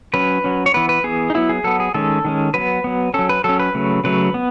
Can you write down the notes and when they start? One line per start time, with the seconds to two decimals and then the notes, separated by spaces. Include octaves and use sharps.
0.14 F#3 C#4 B4
0.44 F#3 C#4
0.66 C#5
0.74 E3 B3 B4
0.89 B4
1.04 E3 B3 G#4
1.30 D#4
1.34 F#3 B3 E4
1.49 G#4
1.64 F#3 B3 A4
1.80 G#4
1.94 D#3 G#3 C#4 A4
2.25 D#3 G#3 C#4
2.54 F#3 B3 B4
2.84 F#3 B3
3.14 F#3 C#4 A4
3.29 B4
3.44 F#3 C#4 A4
3.59 B4
3.75 C#3 F#3 A3
4.04 C#3 F#3 A3 B4
4.34 B3